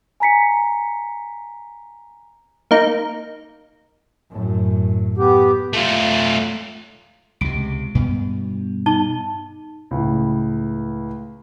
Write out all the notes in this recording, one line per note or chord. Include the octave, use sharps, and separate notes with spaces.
G#5 A#5 B6 C#7
A#3 D#4
F#2 A2
B3 G4
A3 F4
C#2 C3 D7
G2 B2 B3
D#4 A5 G7
C#2 A2